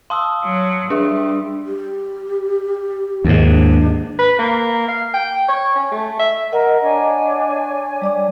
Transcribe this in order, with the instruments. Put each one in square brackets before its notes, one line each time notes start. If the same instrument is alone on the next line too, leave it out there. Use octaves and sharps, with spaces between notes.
[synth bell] F5 A5 [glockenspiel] C6 D#6 E6
[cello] F#3
[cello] G3 [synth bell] D4 G#4 E5
[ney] G4
[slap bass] D#2 G#2
[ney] D4
[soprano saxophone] B4
A#3
F5
G5
C#5
C#4
A3
E5
[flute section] A#4 [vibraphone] D#5 F#5
[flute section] D4 C#5 G#5
[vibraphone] G3 D5 D6